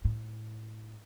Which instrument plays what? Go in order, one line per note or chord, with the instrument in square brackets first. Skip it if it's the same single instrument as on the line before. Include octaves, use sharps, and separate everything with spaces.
[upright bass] A2